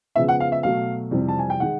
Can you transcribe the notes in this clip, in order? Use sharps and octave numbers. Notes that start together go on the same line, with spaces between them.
C#3 F3 G#3 B3 E5
F#5
F5
E5
B2 F#3 A3 F5
F2 C3 E3 G3
A5
G#5
G5
D#3 G#3 F#5